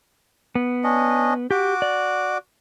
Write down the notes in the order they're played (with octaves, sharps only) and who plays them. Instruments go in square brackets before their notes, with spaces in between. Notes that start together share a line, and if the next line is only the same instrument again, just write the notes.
[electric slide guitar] B3
[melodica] C#4 D4 D#5
[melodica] F#4 D6 [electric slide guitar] G4
[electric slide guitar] D5